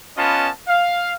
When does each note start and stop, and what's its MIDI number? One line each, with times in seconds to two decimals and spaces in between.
0.17 0.49 59
0.17 0.49 61
0.17 0.49 65
0.17 0.49 71
0.17 0.49 75
0.17 0.49 81
0.68 1.13 77